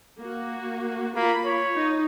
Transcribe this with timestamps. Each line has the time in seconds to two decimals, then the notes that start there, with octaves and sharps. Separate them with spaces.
0.19 A#3 F#4
1.16 A#3 F4 B5
1.45 C#5
1.75 D#4